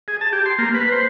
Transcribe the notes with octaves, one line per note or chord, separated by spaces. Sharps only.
G#4
A5
G4
C6
A#3
B4
C5